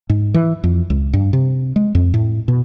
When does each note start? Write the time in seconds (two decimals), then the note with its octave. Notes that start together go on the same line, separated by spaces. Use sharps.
0.10 G#2
0.34 E3
0.64 F2
0.90 C#2
1.13 G2
1.33 C3
1.76 G#3
1.95 F2
2.14 A2
2.48 B2